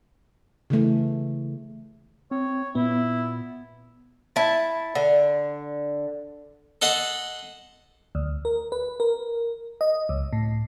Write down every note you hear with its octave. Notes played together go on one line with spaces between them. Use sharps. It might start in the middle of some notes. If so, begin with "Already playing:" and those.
C#3 E3 A3
C4 C#5
A#2 B3 E4
E4 A5
D3
A4 D#5 F#5 C6 D#6
D2
A#4
B4
A#4
D#5
C#2
A2